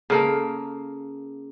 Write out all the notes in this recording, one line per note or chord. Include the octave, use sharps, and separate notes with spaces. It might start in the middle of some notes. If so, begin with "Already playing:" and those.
C#3 A#3 A4